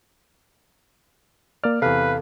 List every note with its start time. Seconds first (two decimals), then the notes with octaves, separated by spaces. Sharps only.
1.64 A#3 D5 F6
1.82 E2 C3 A4 B4 F5